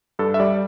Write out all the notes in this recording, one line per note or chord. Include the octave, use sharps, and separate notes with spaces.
G2 A4
E5
G3 D5